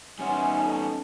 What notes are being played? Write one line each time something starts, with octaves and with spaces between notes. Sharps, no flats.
G3 B3 C#4 D#4 E5 F#5 G#5 C6
A4 D#5 A5